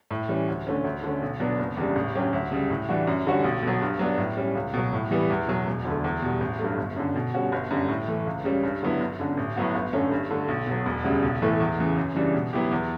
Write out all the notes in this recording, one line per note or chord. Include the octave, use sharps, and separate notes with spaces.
A2
E3 G3 C#4
D2
D3 A3 C#4
D2
D3 A3 C#4
B1
B2 F#3 B3 D4
F#1
E2 C#3 G3 D4
A1
G2 F#3 C#4 G4
D2
C#3 G3
A2
E3 G3 D4 F#4
F#2
D3 G3 C#4 F#4
B1
B2 F#3
G2
F#3 B3 D4
A2
G3 C#4
C#2
B2 F#3
A2
E3 G3 B3
E2
B2 F#3
E1
D2 D3 A3
E2
B2 G3
A1
G2 F#3 A3
G1
F#2 D3
B2
G3 C#4 F#4
G1
F#2 D3 G3
A2
E3 A3
C#2
C#3 G3 C#4
G2
D3 F#3 B3 E4
G1
F#2 D3
A1
A2 F#3 B3 F#4
G1
F#2 D3 A3 C#4
G2
D3 A3
B1
B2 F#3
E1
D2 C#3 G3
B1
A2 E3 A3
E2
C#3 E3
F#2
C#3 E3 G3 D4
B2
F#3 B3 E4 G4
E2